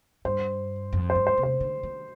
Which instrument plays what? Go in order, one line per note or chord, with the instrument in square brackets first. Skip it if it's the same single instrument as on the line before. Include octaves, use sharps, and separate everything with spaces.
[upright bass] G2 [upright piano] C5
[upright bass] F2
[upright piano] C5
[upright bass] G2
[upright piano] C5
[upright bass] C3
[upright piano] C5
[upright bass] D3
D#3